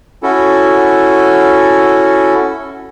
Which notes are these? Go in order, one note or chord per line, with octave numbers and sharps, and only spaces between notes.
C#4 E4 F#4 A4